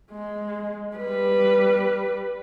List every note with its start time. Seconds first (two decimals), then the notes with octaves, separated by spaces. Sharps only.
0.11 G#3
0.96 G3 B4